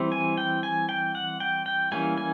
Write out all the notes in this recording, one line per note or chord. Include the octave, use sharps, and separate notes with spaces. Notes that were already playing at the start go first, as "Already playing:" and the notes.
Already playing: E3 G3 C4
G#5
G5
G#5
G5
F#5
G5
G5
E3 G3 A#3 C#4 G#5
G#5